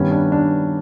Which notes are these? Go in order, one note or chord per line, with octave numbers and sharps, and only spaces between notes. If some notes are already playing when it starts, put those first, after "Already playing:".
Already playing: G2 D#3 G3 B3 C#4
D4
D4